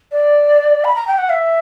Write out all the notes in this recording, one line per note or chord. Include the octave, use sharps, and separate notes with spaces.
D5
B5
A#5
G5
F#5
E5